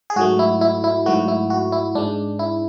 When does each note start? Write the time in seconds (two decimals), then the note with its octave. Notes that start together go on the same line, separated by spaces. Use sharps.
0.10 G#4
0.16 G#2 F#3 A3 F#4
0.39 E4
0.61 E4
0.84 E4
1.06 G#2 F#3 A3 F#4
1.28 E4
1.50 F#4
1.72 E4
1.95 G#2 G#3 D4
2.39 E4